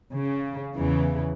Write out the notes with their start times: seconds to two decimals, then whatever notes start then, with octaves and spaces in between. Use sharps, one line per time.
0.14 C#3
0.75 E2 C#3 E3